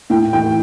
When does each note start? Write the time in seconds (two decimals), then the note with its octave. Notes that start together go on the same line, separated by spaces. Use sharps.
0.10 A2 G5
0.33 E3 G5